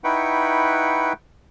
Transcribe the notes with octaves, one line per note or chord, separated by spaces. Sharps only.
D#4 E4 B4 F#5 G5 C#6